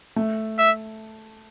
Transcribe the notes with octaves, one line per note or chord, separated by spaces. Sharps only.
A3
E5